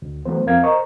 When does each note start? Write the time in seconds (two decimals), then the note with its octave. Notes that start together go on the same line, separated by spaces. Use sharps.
0.02 D2
0.25 E3 F#3 A3 B3 C5
0.46 F2 F3 C4 A#4 F5 G#6
0.63 A#4 C5 D#5 A#5 C#6